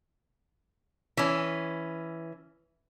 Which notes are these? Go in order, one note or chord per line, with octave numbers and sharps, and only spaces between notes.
E3 C#4